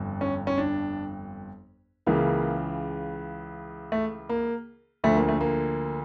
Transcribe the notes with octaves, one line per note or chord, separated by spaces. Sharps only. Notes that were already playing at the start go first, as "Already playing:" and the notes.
Already playing: G1 F2
C#4
C#4
D4
C#2 C#3 E3 A#3
A3
A#3
D2 D3 F3 A3
A#3
A3
A#3